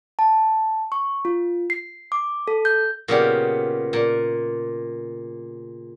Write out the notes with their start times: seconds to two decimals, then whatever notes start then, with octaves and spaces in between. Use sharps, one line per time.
0.19 A5
0.92 C#6
1.25 F4
1.70 C7
2.12 D6
2.48 A4
2.65 G6
3.08 A#2 C#3 B3 G4
3.93 A#2